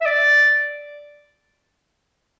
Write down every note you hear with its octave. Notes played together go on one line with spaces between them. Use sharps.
E5
D5